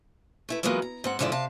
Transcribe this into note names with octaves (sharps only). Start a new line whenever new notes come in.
A3 E4 B4
E3 F#3 G#3 A#3 B3 F4
A#5
G#2 C4 F#5
G#2 D3 F3 E4 C5 D5
C3 F5 A5